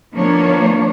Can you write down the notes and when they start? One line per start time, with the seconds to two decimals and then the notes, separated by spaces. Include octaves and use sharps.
0.14 D#3 F3 A#3 B3 D4 C#5